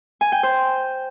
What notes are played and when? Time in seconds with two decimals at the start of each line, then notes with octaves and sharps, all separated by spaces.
0.21 G#5
0.32 G5
0.43 C5